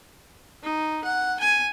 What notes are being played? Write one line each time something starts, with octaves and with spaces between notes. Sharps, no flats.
D#4
F#5
G#5